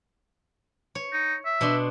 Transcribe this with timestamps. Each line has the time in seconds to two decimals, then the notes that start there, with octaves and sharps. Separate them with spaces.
0.95 C#5
1.13 D#4
1.46 E5
1.61 B2 D4 C6